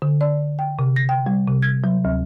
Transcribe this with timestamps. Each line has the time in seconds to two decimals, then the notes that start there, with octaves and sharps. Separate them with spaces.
0.02 D3
0.21 D5
0.59 G5
0.79 C3
0.96 A#6
1.09 G5
1.26 G3
1.48 C3
1.62 G#6
1.84 F#3
2.05 D2